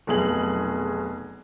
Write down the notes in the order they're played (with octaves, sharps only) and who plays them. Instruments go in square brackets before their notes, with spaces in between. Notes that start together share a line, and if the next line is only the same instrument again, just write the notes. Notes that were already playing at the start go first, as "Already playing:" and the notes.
[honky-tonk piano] F1 B1 G#4 F#7